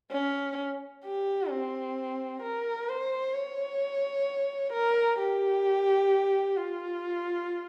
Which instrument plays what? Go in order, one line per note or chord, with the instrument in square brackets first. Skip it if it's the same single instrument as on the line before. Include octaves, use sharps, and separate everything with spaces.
[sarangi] C#4
G4
C4
A#4
C5
C#5
A#4
G4
F4